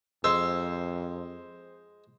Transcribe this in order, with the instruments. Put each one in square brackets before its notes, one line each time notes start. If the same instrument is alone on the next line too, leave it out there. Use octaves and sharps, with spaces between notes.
[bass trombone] F2 [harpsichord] G#3 [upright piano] C5 [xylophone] E6